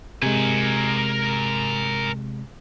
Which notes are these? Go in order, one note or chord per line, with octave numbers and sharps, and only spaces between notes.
C3 G#3 A#4 G#5